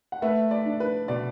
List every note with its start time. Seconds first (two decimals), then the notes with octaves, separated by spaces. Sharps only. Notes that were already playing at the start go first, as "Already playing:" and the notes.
0.12 F#5
0.22 A3 B4 E5
0.51 D5
0.66 D4
0.80 B4
1.08 B2 D5